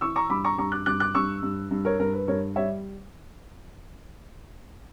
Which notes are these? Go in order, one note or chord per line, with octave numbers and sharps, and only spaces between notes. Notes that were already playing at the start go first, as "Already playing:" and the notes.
E3 C#6 E6
A#5 C#6
G2 B5 D6
A#5 C#6
G2 A#5 C#6
D6 F#6
G2 D6 F#6
D6 F#6
G2 C#6 E6
G2
G2
A#4 C#5
G2 A#4
B4
G2 A#4 C#5
G3 C#5 E5